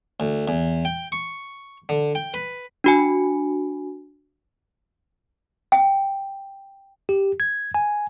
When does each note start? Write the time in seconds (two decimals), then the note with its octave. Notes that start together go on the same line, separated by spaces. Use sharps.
0.20 D2
0.48 E2
0.85 G5
1.12 C#6
1.89 D3
2.15 G5
2.34 B4
2.84 D4 F#4 G#5
5.72 G5
7.09 G4
7.40 G#6
7.75 G#5